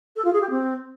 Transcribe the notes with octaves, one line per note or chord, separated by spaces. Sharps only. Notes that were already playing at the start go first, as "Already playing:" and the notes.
A4
F4
G#4
G4
C4